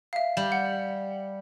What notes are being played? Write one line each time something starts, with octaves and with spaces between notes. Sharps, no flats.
E5 F5
G3
F#5